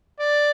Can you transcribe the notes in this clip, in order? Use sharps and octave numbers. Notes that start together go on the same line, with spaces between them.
D5